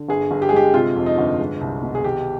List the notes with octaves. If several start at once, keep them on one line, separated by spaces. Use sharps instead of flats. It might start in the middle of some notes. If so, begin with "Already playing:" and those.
Already playing: D3
G1 G#4
G1
G4
G#4
G#3 G4
C3 F4
F2
D#4
G1
G#3
C2
B2
G#4
D#3 G4